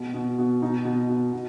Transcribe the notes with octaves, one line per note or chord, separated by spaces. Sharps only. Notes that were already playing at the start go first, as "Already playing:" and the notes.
Already playing: B2
B2
B2
B2 D#4
B2
B2
B2